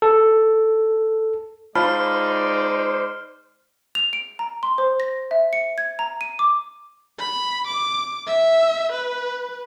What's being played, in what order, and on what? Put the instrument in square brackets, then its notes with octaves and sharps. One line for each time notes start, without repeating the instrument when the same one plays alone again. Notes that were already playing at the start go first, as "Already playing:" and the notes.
[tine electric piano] A4
[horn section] G#3 D#4 D5 [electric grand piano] F4 A5 B5 [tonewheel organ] C5 [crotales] F6
[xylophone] F7
D7
A#5
C6
C5
A#6
E5
C#7
G#6
A#5
D#7
D6
[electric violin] B5
D6
E5
B4